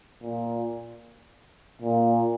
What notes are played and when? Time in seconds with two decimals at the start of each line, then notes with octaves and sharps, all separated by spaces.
0.22 A#2
1.81 A#2